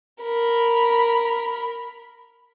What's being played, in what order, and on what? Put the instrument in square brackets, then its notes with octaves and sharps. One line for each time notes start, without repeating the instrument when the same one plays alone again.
[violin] A#4 B5